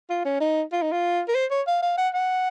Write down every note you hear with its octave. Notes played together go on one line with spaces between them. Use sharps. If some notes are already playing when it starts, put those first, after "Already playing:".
F4
C#4
D#4
F4
D#4
F4
A#4
C5
C#5
F5
F5
F#5
F#5